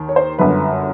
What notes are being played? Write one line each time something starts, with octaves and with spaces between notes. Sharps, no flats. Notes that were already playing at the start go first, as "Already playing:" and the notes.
Already playing: D#2 D#3
C#5
C5
G1 F#2 D3 B4